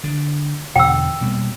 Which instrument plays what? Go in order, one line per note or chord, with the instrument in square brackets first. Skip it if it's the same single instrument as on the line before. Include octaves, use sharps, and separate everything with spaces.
[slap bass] D3
[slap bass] E2 B2 D3 [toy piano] G5 E6
[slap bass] B2 G3 A#3